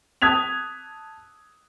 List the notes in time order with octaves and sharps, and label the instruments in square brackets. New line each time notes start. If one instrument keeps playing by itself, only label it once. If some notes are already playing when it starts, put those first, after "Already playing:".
[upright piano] A5 D#6 F#6 G#6 B6 F7